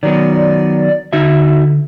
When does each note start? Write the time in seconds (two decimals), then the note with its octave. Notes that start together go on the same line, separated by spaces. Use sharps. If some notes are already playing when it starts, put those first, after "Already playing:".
0.03 D#3 F#3 B3 D5
1.13 D3 D#4 F#4 E5